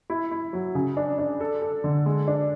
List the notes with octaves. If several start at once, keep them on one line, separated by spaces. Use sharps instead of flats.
E4
E4
F#3
C#3
D4
D4
A4
A4
D3
G#3
D4